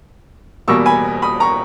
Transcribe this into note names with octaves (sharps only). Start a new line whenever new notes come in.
E2 B2 G3 A#3 C#6 E6
G#5 B5
B5 D#6
A#5 C#6